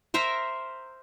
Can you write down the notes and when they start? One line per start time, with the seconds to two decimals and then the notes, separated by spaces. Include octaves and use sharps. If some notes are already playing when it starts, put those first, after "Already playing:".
0.14 A#4 C5 E5 A#5